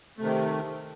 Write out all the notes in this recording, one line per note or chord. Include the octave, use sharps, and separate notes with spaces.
C3 D#3 A3